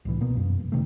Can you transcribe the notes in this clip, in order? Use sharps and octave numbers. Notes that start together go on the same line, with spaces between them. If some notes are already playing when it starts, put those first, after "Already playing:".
C2 A2 E3
B2 A#3 B3
F#2
F1
F#2 C3 D#3 A3